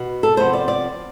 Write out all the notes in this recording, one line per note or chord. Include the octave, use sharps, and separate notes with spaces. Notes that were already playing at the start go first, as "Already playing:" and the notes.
Already playing: B2 B3
A4
C3 F3 B3 C5
D5
D5